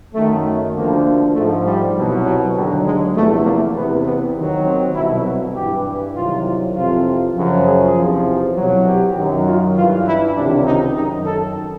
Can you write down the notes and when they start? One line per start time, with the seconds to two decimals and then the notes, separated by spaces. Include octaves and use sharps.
0.14 F#2 D#3 F#3 A3
0.74 D2 D3 F3 A#3
1.35 G#2 F3 A3
1.65 G3
1.95 C2 B2 F#3
2.25 F#3
2.55 D#2 D3 F#3 G3
2.85 G#3
3.15 E2 C3 F3 A3
3.45 A#3
3.76 E2 C3 E3 B3
4.06 B3
4.35 D#2 D#3 F#3
4.65 C4
4.95 C2 B2 F#3 E4
5.26 F#4
5.55 G2 E3 G4
6.15 C2 C3 D#3 F#3 F4
6.75 F2 C3 E3 F4
7.36 F#2 C#3 F3
7.66 G#4
7.96 E2 C3 F3
8.56 C2 B2 F#3
8.86 G4
9.16 F#2 D#3 F#3
9.47 F4
9.76 G2 E3 F4
10.07 E4
10.36 C#2 C3 D#3 D4
10.67 D#4
10.96 F#2 D#3 F#3 D#4
11.26 A4